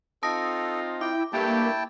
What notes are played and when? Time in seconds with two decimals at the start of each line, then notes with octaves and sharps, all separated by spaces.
0.23 C4 D#4 F4 A4 A5 D#6 A#6
1.01 E4 G5 D6
1.33 G2 A3 A#3 E4 G4 G5 A5